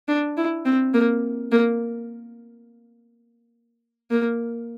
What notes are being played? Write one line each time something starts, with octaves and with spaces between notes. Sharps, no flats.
D4
E4
C4
A#3
A#3
A#3